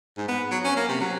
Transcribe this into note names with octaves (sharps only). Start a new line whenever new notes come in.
G#2
B3
F#3
C#4
A#3
C3
F#3